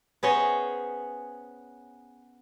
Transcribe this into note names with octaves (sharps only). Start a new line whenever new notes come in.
B3 C#4 G#4 C5 C#5 D#5